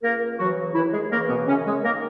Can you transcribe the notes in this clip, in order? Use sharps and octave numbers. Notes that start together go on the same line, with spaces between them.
C#2 A#3 A#4
C#3 E3 F#3 F#4
D#2 E3 E4
G#3 G#4
C#3 E3 A#3 A#4
B2 B3
F#2 C#3 C#4
G#3 G#4
D#3 A#3 A#4